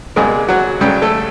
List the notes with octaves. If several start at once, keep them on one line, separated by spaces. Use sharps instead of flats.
C#2 B2 G3 G#3 A#3 G#4
F#3 F#4
C#2 C#3 F#3 G3 A3 G4
A3 A4